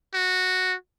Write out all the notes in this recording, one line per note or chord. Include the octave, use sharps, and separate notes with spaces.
F#4